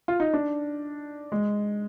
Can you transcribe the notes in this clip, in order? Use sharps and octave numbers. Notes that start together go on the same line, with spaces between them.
F4
D#4
D4
G#3